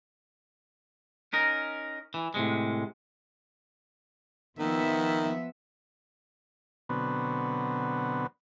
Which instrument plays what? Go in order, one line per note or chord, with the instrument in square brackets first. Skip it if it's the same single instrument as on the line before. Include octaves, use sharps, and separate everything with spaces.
[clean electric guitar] C#4 D#4 A#4
E3
A2 C3 G#3
[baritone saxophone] D#3 [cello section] F3 B3 E5
[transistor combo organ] B2 D3 F#3 B3 C4